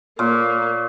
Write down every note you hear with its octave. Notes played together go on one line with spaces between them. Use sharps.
A#2 A#3 C#5